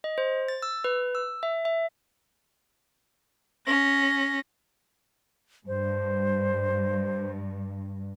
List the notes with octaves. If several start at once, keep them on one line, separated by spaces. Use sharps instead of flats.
D#5
C5
A6
E6
B4
E6
E5
E5
C#4 A#6
G2 C5